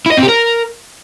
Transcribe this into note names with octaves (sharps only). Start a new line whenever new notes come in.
E4
D#5
C4
G4
A#4